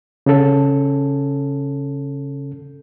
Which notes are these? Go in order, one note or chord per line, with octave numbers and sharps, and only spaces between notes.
C#3 C#4 A4